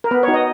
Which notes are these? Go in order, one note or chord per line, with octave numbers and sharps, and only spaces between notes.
A#4
B3 B4
C#5
D#4 F#4
D#5